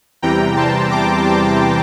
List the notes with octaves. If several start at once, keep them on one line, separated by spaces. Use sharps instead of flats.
E2 C3 E3 G3 G5 A#5
A5 C6
A#5 D6
A5 C6